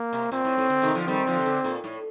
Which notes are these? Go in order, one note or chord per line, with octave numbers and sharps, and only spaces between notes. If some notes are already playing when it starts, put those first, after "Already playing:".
Already playing: A#3
C3
A#2 C4
A2
A2
D3
C3 D#3
D3 F3
D#3 G3 C4
D3 F3
C3
D3
A#2
A2